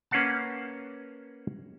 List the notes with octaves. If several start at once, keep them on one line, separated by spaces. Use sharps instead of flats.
A#3 C#4 B4 F5 F#5 A5